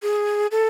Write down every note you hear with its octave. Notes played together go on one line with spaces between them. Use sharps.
G#4
A4